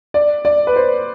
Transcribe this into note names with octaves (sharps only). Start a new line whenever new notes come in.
D5
D5
B4
C5